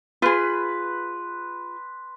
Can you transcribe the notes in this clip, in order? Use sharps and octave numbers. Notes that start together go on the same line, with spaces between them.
F4 G#4 B4 C6